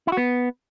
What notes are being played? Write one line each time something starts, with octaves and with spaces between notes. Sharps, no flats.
E4
F#4
B3